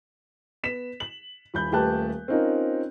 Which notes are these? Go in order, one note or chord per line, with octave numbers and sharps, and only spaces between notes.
B3 B6 E7
F#7
D#1 B5 G6
D#1 A3 G4 B4 A5 F#6
C4 C#4 D#4 F4 A#4